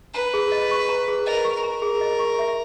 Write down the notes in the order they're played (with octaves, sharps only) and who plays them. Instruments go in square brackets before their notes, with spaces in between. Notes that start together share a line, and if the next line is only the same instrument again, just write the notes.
[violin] B4 [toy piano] A#5
[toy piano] G#4
D#5
C#6
A#5
G#4
[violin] A#4 [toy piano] D#5
[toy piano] C#6
[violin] A#4
[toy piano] A#5
G#4
D#5
C#6
E5